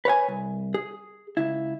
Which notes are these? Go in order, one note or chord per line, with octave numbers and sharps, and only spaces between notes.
B4 C#5 F#5 G#5
C2
G#4
C#2 E4